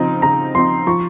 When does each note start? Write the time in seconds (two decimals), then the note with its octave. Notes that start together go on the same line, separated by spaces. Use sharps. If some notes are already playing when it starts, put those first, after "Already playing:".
Already playing: C#3 F3 C4 D#4 A#5
0.22 C#3 A#5
0.55 F3 C4 D#4 C6
0.87 F3 C#6